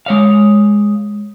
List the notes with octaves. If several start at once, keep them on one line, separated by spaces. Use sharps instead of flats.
G#3 C#5 F5